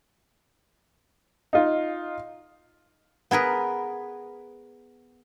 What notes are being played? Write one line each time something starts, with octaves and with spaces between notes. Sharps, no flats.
D#4 F4
B3 G#4 A#4 B4